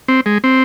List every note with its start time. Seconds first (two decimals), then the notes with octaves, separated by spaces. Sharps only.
0.08 C4
0.26 G#3
0.44 C4